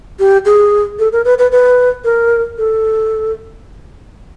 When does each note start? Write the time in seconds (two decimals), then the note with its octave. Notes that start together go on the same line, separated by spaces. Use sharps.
0.19 G4
0.45 G#4
0.99 A4
1.12 A#4
1.25 B4
1.39 B4
1.52 B4
2.04 A#4
2.58 A4